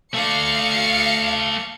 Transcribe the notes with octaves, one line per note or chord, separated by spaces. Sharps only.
A3 D5 F5 C#7